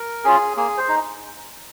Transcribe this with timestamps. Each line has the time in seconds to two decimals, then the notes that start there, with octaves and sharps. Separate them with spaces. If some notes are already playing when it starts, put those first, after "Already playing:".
Already playing: A#4
0.24 C#4 F4 G#4
0.57 A#3 G#4
0.78 C5
0.88 D#4